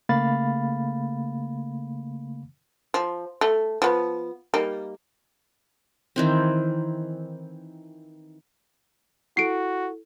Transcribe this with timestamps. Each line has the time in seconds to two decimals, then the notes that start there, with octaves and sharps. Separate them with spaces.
0.09 C#3 A3 A#3 F5 B5 A6
2.94 F3
3.41 A3
3.82 F3 B3
4.54 G3 A#3 D#4
6.16 D#3 E3 C4
9.37 E4 F#4 A4 C7 D7